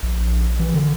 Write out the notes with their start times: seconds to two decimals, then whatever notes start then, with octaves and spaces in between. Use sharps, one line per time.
0.03 A#1
0.60 E3
0.74 D3